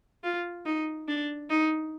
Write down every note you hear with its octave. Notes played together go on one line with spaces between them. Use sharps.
F4
D#4
D4
D#4